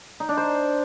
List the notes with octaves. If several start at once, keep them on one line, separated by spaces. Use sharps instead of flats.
D#4
D4
C5